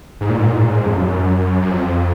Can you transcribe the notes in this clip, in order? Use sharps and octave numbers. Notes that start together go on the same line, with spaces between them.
G#2
A#2
G#2
A#2
G#2
A#2
G#2
F2
F#2
F#2
F2